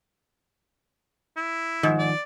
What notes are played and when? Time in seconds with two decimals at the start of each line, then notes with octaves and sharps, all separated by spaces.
1.37 E4
1.83 G#2 D#3 F3
1.99 D5